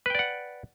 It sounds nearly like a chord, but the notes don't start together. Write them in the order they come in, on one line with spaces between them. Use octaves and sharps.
B4 G5 D5 F#5